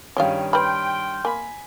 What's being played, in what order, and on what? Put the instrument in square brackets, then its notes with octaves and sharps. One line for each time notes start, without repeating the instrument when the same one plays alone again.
[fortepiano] G2 D#3 C#4 [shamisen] G#3 F4 F5
[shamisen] B4 B5 [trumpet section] G5 [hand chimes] C6 F6
[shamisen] A#3 [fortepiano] G#5 B5